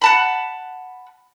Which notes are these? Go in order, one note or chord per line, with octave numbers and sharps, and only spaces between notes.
F#5 A5 B5